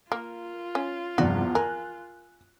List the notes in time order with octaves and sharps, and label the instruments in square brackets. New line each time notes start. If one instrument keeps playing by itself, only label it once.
[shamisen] A#3 [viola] F4 [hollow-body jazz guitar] A#4
[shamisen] C#4
[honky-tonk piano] E2 F3 D5 [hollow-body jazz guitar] G2 C3 [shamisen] F#4
[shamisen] A#4 [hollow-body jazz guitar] G#5 [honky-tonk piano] F#6